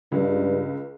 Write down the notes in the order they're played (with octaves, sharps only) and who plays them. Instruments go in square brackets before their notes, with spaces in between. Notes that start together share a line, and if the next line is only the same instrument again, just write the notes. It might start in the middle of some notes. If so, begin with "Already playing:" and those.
[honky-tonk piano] C#2 [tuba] G2